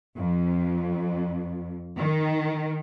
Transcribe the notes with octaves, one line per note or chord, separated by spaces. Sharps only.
F2
D#3